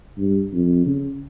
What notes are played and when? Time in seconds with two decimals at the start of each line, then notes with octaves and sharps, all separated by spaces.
0.18 G2
0.53 F2
0.86 C#3